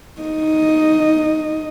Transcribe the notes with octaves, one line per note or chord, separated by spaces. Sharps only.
D#4 D#5